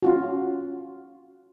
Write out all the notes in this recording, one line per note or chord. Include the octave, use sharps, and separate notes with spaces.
C#4 F4 F#4